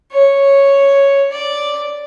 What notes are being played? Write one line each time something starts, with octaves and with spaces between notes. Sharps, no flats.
C#5
D5